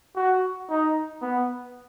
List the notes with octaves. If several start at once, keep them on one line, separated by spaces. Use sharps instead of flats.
F#4
D#4
B3